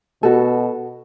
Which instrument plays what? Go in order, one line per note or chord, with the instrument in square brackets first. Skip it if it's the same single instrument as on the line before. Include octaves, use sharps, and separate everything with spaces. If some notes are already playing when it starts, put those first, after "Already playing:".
[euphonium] B2 [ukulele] F#4 A4